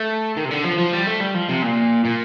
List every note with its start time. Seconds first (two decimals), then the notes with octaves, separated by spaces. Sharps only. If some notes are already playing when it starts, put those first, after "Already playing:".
Already playing: A3
0.37 D#3
0.45 C3
0.51 D3
0.64 F3
0.79 F3
0.93 G3
1.07 A3
1.21 G3
1.35 F3
1.49 C3
1.63 A#2
2.05 A#2